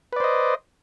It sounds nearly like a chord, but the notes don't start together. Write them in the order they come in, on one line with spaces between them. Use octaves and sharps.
B4 D5 C5 D#5